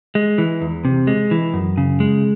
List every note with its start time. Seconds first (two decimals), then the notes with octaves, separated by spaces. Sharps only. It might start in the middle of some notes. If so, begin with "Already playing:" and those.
0.15 G#3
0.38 E3
0.62 E2
0.85 C3
1.07 G#3
1.31 E3
1.54 F#2
1.77 C#3
2.00 G#3